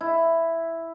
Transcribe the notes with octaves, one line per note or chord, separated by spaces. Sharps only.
E4